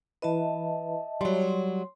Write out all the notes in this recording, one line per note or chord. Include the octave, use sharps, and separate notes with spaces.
E3 E4 B4 D#5 E5 A5
F#3 G3 C6